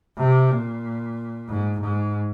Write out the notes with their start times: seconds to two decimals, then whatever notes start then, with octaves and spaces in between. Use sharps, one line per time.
0.18 C3
0.51 A#2
1.48 G#2
1.80 G#2